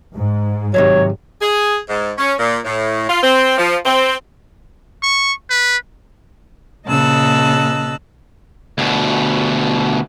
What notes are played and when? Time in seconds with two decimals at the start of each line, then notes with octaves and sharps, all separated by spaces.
0.16 G#2
0.74 C3 D#3 F#3 C#5
1.41 G#4
1.89 G#2
2.18 C#4
2.39 A#2
2.64 A2
3.08 F4
3.23 C4
3.58 F3
3.86 C4
5.03 C#6
5.50 B4
6.87 A#2 C#3 D#5 A5 E6 F#6
8.78 D2 B2